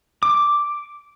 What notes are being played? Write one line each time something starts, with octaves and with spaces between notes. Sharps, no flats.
D6